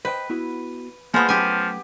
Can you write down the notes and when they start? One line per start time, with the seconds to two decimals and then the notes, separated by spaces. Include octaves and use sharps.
0.05 B4 C5 D#5 G5
0.30 B3 E4 F#4
1.14 F3 G#3 A#3 B3
1.29 F3 F#3 A3 C#4 G4 G#5